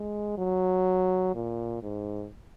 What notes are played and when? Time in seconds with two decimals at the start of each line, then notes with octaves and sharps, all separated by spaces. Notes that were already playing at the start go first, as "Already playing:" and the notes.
Already playing: G#3
0.38 F#3
1.34 A#2
1.83 G#2